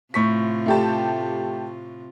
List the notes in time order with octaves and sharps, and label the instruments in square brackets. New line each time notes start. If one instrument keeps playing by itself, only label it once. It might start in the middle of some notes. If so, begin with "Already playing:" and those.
[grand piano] A2 C#6 B6 [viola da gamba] C3 F4
[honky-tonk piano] A3 G4 A5